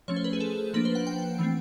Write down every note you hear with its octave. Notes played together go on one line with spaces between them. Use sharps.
F3 A3 C#4 C#5
C5
B4
G#4
A4
F3 A#3 D4 B4
C5
F#5
G5
E3 A3 C4